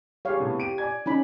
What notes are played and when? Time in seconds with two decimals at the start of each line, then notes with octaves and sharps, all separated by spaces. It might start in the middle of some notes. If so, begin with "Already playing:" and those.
0.25 G3 G#4 C#5 F5
0.40 A2 C3 B3
0.58 G4 D7 D#7
0.78 D5 G#5 G#6
1.06 C#4 D#4 B5